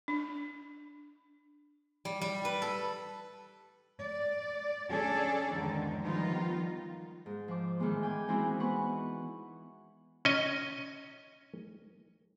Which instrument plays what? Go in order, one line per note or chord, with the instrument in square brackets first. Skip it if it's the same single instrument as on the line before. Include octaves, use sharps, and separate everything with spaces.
[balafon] D4
[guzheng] G3
G3
B4
A4
[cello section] D5
C#4 D4 G#4 A4 D5
E2 G#2 D3 D#3
D#3 F3 G3 B3 D#4 F4
[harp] G#2
F3 D6
A2 D#3 E3 G#3 B3
G5 G#5 D6
E3 G#3 C4 D#4 E4 F#4
B3 B4 F#5 C#6
[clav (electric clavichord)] C#4 D#5